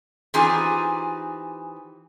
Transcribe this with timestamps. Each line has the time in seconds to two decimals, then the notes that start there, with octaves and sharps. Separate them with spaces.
0.34 E3 C4 D#4 F4 G4 G#4